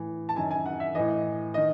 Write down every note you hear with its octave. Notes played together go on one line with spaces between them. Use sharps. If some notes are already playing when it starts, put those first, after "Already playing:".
Already playing: A2 E3
A5
F#2 D#3 G#5
G#5
F#5
E5
A2 E3 D#5
D#3 D#5